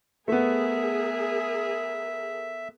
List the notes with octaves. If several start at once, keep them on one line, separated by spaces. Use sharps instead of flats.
A3 B3 G#4 A#4 E5